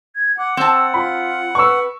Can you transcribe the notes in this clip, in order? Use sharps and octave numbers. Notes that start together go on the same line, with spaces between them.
G#6
F#5 D6
C4 A5 E6
F4 B5
B4 C#6 E6